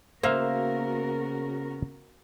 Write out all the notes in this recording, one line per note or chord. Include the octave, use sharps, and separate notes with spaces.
C#3 A#3 B3 F#4 A#4 C5 E5 F5